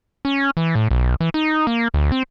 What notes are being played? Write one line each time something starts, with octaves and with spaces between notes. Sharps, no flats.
C#4
E3
A2
B1
E3
D#4
A#3
D2
C4